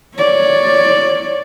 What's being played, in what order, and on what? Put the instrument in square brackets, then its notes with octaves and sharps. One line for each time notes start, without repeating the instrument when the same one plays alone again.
[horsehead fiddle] C#5 D5